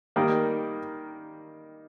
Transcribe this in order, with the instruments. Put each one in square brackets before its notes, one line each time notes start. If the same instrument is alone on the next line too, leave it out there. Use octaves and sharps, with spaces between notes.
[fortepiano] D#3 G3 A#3